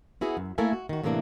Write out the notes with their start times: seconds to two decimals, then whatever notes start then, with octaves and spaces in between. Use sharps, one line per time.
0.21 B3 E4 F#4 G#4
0.37 F#2
0.58 A3 A#3 E4 A4 A#4 G#5
0.73 F#4
0.89 D#3 F#4
1.04 A2 C3 E3 A#3 C4 D4